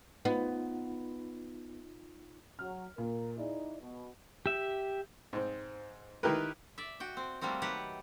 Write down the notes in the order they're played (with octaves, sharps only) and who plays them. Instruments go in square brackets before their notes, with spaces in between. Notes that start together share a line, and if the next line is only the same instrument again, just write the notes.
[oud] B3 [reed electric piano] D#4 F4
[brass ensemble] F#3 [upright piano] F6
[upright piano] A#2 [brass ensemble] A#4
[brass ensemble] D#4 E4 D5 [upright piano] G#4
[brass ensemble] B2
[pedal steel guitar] G4 E5
[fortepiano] G#2 C4
D#3 D#4 E4 G4 A#4 B4
[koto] D5 E5
F#4 G5
C4
G3 A3 A#3 C4 F#4
D#3 F#3 G4 B4 F#5